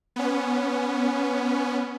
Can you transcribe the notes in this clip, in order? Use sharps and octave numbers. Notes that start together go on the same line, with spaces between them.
B3 C#4